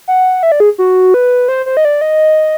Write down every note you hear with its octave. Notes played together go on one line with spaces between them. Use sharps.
F#5
E5
D5
G#4
F#4
B4
C5
C5
D#5
D5
D#5